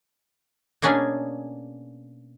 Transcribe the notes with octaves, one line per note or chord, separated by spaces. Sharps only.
B2 A#3 C#4 D4 G#4